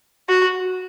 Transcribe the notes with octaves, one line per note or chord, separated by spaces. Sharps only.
F#4